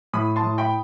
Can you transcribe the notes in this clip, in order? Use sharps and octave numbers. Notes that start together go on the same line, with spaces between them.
A2 B5 D#6
A5 C6
A2
G5 B5